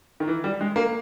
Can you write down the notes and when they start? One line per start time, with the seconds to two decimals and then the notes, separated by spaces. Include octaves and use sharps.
0.20 D#3
0.28 E3
0.44 G3
0.61 G#3
0.76 A#3